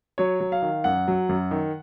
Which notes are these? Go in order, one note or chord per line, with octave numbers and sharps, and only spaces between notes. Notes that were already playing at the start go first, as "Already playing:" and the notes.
F#3 C#5
F#3
F5
D#3
F#2 F#5
F#3
F#2
D#3